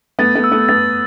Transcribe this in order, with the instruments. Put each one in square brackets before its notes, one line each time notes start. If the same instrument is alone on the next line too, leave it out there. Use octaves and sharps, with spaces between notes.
[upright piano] A3 B3 [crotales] A6
[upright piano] A3 B3
[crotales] E6
[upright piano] A3 B3
[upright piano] A3 B3 [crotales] A6